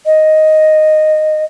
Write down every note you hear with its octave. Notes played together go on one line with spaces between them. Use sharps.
D#5